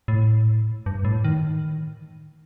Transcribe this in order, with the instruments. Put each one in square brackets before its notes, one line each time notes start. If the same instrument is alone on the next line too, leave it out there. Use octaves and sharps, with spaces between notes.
[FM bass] A2
G2
A2
D#3